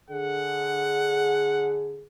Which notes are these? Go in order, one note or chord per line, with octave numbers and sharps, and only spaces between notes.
D3 G#4 F#5